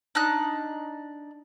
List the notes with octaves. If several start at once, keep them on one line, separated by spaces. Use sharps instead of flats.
D4 D#4 F#6